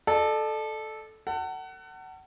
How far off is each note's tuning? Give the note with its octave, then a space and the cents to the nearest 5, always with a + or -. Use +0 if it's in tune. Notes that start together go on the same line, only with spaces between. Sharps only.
A4 -10 D5 +45
A4 +40 F#5 +30